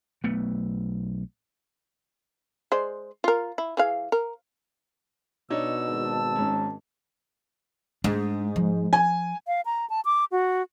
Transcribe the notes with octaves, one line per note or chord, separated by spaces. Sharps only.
B1 A3 B3
G#3 C5 D5
F4 A#4
E4
E3 G#4 F5
A#4
B2 D4 D#4 C#5 E6
G#1 A5
G#2 C#4
G#2 D4
F3
G#5
F5
A#5
A5
D6
F#4